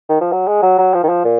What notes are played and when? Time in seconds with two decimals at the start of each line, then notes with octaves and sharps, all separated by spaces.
0.09 D#3
0.21 F3
0.32 F#3
0.48 G#3
0.62 F#3
0.78 F#3
0.94 F3
1.03 D#3
1.09 F3
1.25 A#2